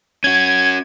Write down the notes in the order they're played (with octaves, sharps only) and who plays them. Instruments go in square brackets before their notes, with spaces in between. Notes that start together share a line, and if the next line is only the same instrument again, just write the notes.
[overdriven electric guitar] C#4 F#4 [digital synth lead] G#6